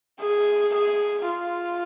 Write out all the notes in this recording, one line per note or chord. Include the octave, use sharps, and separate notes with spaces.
G#4
G#4
F4